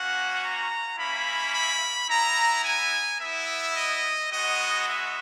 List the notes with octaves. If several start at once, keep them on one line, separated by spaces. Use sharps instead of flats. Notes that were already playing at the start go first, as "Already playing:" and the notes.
Already playing: A#3 C#4 F#4 F#5
A#5
A#3 C#4 E4 B5
B5
B3 E4 A#5
G#5
B3 E4 E5
D#5
G#3 B3 F#4 D#5
E5